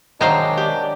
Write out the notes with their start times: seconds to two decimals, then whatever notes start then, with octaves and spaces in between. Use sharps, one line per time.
0.21 D#3 F#3 G#3 D4 C5 F5 A#5
0.57 G4